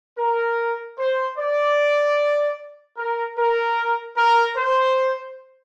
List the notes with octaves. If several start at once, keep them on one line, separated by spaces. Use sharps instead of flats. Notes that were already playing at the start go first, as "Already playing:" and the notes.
A#4
C5
D5
A#4
A#4
A#4
C5